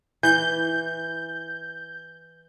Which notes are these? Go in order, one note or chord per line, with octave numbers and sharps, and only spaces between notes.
E3 G6